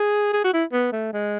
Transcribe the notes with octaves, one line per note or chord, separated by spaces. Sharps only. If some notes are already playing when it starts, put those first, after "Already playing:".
Already playing: G#4
G#4
F#4
E4
B3
A3
G#3